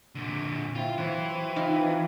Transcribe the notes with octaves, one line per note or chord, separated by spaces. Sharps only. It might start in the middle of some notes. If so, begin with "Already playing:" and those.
A#2 D3
C4 E4 F4
E3 F#3 C5
D#4 F4
B4